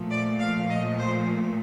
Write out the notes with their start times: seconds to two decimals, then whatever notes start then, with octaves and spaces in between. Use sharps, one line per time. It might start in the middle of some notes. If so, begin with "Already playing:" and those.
Already playing: A#2 F3 A3
0.11 D5
0.40 F5
0.69 D#5
0.98 C5